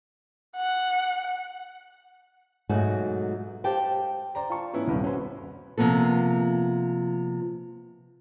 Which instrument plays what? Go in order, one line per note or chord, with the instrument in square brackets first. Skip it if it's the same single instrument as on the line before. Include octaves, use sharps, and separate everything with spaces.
[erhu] F#5
[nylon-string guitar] G#2 B2 F#3 G#3 A3 F#4
G4 C5 F5 G5 A5
[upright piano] C5 D5 A#5
F4 G5 A5 C#6
A2 E3 B3 C#4 E4
D#1 G2 C3
C#4 F#4 B4 C5
[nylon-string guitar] C3 F3 A#3 B3 A4